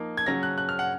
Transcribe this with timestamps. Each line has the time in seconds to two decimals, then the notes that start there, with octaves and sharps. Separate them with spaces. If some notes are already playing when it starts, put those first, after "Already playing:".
Already playing: F3 A#3 D#4
0.17 G#6
0.26 C#3 F#3 C#4 A#6
0.43 F#6
0.58 F#6
0.69 F6
0.79 F#5